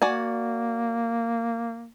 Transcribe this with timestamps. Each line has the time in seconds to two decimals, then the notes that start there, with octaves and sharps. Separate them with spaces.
0.02 A#3 F#4 D5 G#5